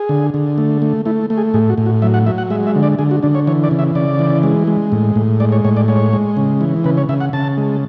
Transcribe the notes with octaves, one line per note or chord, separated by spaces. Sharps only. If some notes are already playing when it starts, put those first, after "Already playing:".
Already playing: G#4
D3
D3
A3
A3
A3 E4
A3
G#4
A2 G#4
F#4
A2
F#4
F#3 E5
F#5
F#3 E5
F#5
G#3 E5
E5
D3
D5
D3 G#4
F#4
D3 D4
C#5
E3 C#5
D5
C#3
E5
C#3 D5
E3
G#3
G#3
A2
A2
G#3 D5
C#5
A2 C#5
D5
G#3 C#5
G#3
C#3
E3
C#3 B4
C#5
C#3 E5
F#5
C#3 A5
G#3